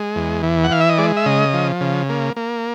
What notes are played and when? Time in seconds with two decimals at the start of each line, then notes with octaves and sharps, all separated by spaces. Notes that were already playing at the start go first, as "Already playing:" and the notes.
Already playing: G#3
0.16 E2
0.43 E3
0.64 F#5
0.71 E3 F5
0.81 E5
0.89 D#5
0.98 G#3 D5
1.17 E5
1.26 C#3 D#5
1.53 F3
1.81 C#3
2.09 A#3
2.36 A#3